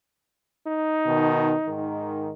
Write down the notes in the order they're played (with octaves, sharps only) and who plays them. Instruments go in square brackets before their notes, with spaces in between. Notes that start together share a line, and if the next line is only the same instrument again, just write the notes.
[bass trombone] D#4
[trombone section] B2 D#3
G#2 D#3